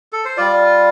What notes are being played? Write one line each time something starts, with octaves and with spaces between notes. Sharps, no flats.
A4
C5
G3 F4 D5